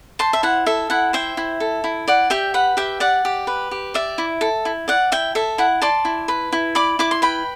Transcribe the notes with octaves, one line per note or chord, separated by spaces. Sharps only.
C5 A5 C6
E5
E4 F#5
A4 E5
E4 F#5
C5 E5 G5
E4
A4
E4
D5 F#5
G4 E5 G5
B4 F#5
G4 E5 G5
D5 F#5
G4
B4
G4
D5 E5
E4
A4
E4
D5 F#5
E4 E5 G5
A4 E5
E4 F#5
D5 A5 C6
E4
B4
E4
D5 B5 D6
E4 D6
C6
B4 G5 B5